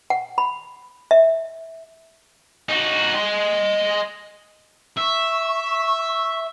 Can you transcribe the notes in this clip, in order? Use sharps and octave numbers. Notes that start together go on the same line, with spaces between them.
F#5
B5
E5
D#4 F#4
D#5 C6
E5 C#6